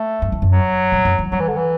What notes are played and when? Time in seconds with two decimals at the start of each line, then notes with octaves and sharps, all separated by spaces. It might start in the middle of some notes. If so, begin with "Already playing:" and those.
Already playing: A3
0.22 G2
0.32 E2
0.42 F#2
0.52 F#3
0.92 G2
1.05 F#2
1.19 E3
1.32 F#3 G3
1.40 E3
1.48 D3
1.57 E3